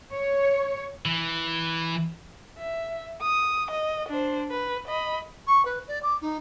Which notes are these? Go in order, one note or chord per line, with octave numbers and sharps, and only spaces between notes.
C#5
E3
E5
D#6
D#5
D4 C5
B4
D#5 B5
C#6
B4
D5
D6
D#4